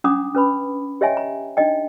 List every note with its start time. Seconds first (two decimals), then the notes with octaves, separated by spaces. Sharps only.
0.04 C#4 D4 F#5 A#5 D6 D#6
0.34 C#4 B4 B5
1.01 G4 C#5 D#5 E5 G5 G#5
1.17 A#5
1.57 D4 D#4 D#5 G5